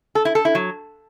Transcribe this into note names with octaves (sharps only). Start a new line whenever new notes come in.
A4
E4
A4
E4
F#3